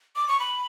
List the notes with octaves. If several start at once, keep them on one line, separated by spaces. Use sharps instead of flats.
D6
C#6
B5